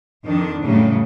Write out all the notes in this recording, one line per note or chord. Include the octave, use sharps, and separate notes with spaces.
F2 D#3 D4
F2 A2 C#3 F#3 G3